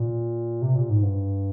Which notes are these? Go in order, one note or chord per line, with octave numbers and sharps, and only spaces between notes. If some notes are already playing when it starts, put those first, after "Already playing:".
Already playing: A#2
C3
A#2
G#2
G2